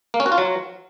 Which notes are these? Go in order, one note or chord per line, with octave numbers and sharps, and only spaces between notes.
A#3
C#4
F#4
F4
F#3